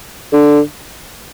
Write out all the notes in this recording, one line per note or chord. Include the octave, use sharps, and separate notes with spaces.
D3